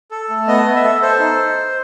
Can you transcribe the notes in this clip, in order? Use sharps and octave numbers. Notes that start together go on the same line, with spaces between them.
A4
A3
B3 D#5
B3
E5
A4
A4 C5
D#4